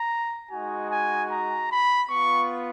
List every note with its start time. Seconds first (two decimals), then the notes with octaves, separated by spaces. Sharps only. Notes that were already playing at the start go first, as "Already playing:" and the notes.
Already playing: A#5
0.51 G#3 D#4 F#4 G#5
0.91 G#5
1.31 A#5
1.70 B5
2.09 B3 F4 C#6